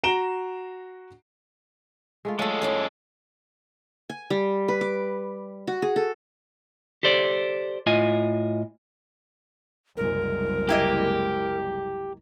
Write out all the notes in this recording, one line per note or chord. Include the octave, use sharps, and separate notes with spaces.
F#4 A#5 D7 E7 G7
G#3 A3 F4
F#3 G#3 A3 F4 A4 D#5
F#2 E4 G#4 C#5
G#5
G3
B4
D6
F#4
G#4
A4
G4 A4 C5 D5
A2 F4 D#5 G#5
F#1 C2 G#3 A#4
A#3 E4 G4 D#5